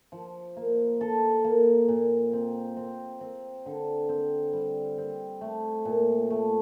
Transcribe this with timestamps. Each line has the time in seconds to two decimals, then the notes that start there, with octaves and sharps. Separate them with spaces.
0.12 F3
0.57 A#3
1.01 A4
1.44 A#3
1.88 A#2
2.33 C4
2.77 C4
3.21 C4
3.66 D3
4.09 C4
4.53 G3
4.98 C4
5.41 A3
5.85 A#2
6.30 A3